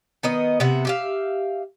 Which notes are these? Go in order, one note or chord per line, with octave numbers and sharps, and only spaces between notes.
D#3 B3 D#5
C3 B3 E5 F#5
G4 E5 F5